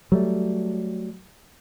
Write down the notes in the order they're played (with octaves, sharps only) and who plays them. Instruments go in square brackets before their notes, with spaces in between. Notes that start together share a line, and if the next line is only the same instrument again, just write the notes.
[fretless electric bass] F#3 G3 A3